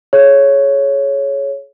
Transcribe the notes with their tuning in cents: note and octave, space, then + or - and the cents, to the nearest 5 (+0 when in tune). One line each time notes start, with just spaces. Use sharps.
G#4 +35 C#5 +0